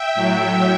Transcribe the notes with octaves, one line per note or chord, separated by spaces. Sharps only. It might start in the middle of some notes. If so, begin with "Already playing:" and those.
Already playing: E5 G5
A2 F#3